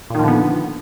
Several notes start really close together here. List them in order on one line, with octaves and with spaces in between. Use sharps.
A#2 D#3 F3 D3 B3